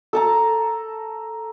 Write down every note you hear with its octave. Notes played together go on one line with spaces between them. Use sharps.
A4 A5 A#5